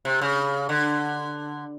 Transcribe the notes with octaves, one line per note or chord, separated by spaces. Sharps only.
C3
C#3
D3